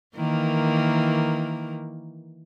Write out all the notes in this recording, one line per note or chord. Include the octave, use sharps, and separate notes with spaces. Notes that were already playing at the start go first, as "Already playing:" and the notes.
D#3 E3 A#3